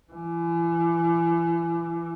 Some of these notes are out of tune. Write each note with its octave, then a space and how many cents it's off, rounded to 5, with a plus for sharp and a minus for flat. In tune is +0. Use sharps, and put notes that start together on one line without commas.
E3 +35